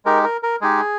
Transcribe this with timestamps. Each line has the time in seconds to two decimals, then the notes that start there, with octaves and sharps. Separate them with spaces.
0.05 G#3 D#4 G4 A#4
0.24 A#4
0.43 A#4
0.61 G#3 D#4 G4 G#4